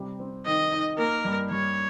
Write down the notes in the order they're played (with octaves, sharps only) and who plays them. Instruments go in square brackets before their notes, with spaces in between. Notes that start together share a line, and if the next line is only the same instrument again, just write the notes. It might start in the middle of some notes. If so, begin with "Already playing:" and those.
Already playing: [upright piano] C3 G3
C4
[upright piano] D#3 [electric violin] D#5
[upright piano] D#4
[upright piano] A#3 [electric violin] A#4
[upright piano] G2
[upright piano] G2 [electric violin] C#5